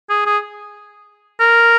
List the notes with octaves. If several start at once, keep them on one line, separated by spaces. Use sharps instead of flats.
G#4
G#4
A#4